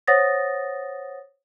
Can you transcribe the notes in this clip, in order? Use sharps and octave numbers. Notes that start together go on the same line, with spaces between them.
C5 C#5 F#5 D#6 A6 A#6